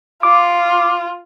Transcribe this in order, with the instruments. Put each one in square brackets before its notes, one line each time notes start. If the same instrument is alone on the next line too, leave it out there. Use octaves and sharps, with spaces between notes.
[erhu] F4 [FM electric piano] D6